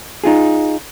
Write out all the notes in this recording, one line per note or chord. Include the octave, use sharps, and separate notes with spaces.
D#4 F4 G#4